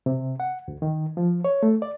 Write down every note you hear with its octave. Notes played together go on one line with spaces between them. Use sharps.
C3
F#5
D2
D#3
F3
C#5
A3
D5